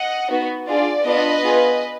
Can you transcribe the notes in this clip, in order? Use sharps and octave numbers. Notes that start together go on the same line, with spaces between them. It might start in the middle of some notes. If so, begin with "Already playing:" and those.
Already playing: D#5 F#5
B3 D#4 F#4
D4 F4 G#4 D5
B3 D4 F4 B4 D#5
B3 F4 G#4